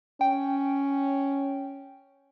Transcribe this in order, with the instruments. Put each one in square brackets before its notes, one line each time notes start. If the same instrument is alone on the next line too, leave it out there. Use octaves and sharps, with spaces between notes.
[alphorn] C#4 [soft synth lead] G5